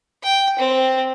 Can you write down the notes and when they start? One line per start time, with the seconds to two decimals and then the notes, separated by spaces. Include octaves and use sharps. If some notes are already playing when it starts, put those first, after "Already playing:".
0.23 G5
0.59 C4